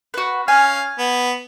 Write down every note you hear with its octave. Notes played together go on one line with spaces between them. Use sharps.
F#4 B4
C#4 F5 G#5
B3